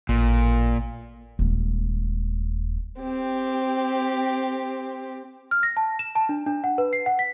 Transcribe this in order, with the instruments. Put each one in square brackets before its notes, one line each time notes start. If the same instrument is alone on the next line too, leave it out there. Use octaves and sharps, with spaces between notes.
[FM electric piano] A1 [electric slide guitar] A#2
[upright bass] D#1 G#3
[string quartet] C4 G4
[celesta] F6
A#6
A5
E7
A5
D4
D4
F#5
B4
C7
F#5
B6